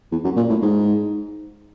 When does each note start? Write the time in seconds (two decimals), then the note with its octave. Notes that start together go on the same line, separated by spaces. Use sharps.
0.12 E2
0.24 F#2
0.37 A#2
0.49 A2
0.62 G#2